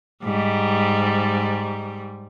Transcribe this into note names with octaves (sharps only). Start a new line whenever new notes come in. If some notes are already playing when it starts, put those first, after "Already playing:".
G#2 G3